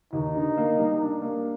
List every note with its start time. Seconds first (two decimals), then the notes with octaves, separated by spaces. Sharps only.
0.13 D#2 D#4
0.35 D3
0.57 A#3
0.78 G3
1.01 D4
1.22 A#3